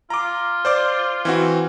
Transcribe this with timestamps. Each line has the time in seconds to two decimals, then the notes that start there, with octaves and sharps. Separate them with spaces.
0.10 F4 A#5 D6
0.65 C5 D5 D6
1.25 E3 C4 F#4